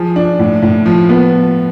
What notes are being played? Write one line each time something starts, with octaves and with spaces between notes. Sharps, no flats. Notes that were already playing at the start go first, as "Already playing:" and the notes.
Already playing: F3 G#4
D4
A2
A2
F3
B3